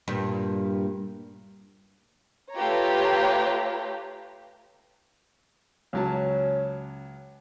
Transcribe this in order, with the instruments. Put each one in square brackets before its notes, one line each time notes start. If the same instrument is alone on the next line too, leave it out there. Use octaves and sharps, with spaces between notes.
[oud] G2 A#2
[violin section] A3 F4 G4 B4 C#5 A#5
[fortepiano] C#2 F#3 A5 [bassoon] C#4